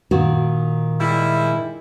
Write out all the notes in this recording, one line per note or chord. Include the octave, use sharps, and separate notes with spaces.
A#2 D#3 F#4
G3 G#3 E4